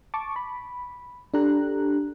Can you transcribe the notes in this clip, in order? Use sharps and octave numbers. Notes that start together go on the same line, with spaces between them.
A5 C#6 D6
B5
D4 G4 A4 A#5 F#6